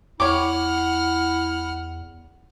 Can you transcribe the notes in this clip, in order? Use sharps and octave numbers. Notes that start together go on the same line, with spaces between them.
E2 E4 C#5 F#5 D6 F6